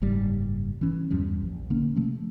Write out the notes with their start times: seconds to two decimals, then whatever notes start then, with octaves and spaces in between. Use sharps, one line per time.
0.02 F#1 G#2 G3
0.81 E3 C#4
1.10 E2 G2 F3 G3
1.42 A#1
1.70 D3 A#3 C#4
1.96 C3 F3 A3